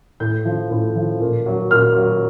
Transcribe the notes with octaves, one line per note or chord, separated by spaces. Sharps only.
A2 G6
F3
A2
F3
A#2
F#3
A#2 F6
F#3